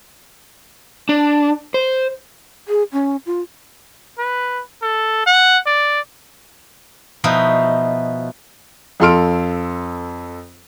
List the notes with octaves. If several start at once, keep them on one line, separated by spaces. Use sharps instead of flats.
D4
C5
G#4
C#4
F4
B4
A4
F#5
D5
B2 F3 D#4 E4 F#4
F2 F4 A4 C6 F6 D7